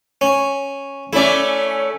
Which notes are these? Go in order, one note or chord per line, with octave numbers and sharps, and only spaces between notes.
C#4
A3 C#4 E4 D5